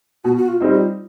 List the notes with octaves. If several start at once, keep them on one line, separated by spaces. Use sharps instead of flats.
B2 F#4
F#4
F4
G3 C4 D#4
F4